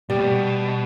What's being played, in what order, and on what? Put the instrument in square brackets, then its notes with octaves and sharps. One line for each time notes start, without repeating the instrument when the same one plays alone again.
[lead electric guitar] B2 [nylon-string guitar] G3
[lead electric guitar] A2
B2